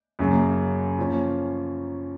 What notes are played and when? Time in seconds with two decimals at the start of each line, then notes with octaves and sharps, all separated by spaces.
0.19 F#2 C#3 F#3 A#3
0.98 F3 A#3 C#4